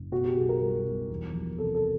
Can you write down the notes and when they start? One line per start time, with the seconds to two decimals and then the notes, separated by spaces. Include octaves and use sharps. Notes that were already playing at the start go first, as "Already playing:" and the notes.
Already playing: F#1
0.12 B2 F#4
0.25 G4
0.36 B1 G#4
0.49 A#4
0.60 G3 A#4
0.85 B1
1.09 E2
1.34 F3
1.58 C3 A4
1.75 A4